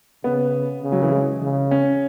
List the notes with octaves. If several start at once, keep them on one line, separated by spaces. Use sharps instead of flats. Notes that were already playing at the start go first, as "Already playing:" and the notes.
C#3 B3
C#3
F#3
E3
G#3
C#3
C#4